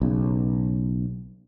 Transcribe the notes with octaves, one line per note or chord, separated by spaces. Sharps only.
B1 C#3